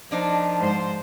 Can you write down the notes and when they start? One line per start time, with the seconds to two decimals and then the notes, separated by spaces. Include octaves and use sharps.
0.11 F3 A#3 D4 D#4
0.57 G#2 C5